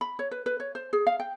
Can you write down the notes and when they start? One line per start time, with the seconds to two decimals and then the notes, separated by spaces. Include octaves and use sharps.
0.01 B5
0.19 C#5
0.31 B4
0.46 B4
0.60 C#5
0.75 C5
0.93 G#4
1.07 F5
1.20 G5